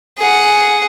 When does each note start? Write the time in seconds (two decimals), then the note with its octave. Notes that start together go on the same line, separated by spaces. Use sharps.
0.18 G#4 F#5